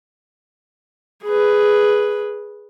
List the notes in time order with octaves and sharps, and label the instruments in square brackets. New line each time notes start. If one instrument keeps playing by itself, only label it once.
[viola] G#4 B4